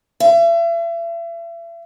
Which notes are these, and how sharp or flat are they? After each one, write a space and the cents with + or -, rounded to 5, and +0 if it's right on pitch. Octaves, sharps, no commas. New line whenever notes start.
E5 +40